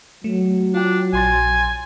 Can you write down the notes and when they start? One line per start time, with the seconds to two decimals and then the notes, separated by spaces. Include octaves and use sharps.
0.24 F#3 A3
0.74 D4 F4 G5
1.13 A#1 G#5 C6 A6